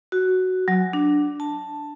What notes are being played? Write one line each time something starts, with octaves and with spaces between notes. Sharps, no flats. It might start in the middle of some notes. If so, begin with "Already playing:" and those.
F#4
F#3
D4
A5